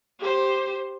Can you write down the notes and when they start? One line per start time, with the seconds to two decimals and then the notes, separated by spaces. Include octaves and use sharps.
0.20 G4 C5